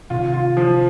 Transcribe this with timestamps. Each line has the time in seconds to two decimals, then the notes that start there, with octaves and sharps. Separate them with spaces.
0.10 C3 D#3 F4
0.33 F4
0.57 F3